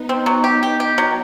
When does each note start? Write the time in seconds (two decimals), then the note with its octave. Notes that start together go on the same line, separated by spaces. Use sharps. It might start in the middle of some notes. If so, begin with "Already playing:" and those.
Already playing: B3 D#4
0.09 C4
0.26 F#3
0.44 G4
0.63 G4
0.80 G4
0.98 F#3